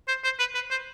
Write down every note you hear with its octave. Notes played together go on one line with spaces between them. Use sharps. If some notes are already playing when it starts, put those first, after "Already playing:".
C5
C5
B4
B4
C5